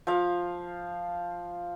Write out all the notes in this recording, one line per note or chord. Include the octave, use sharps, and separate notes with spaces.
F3 F5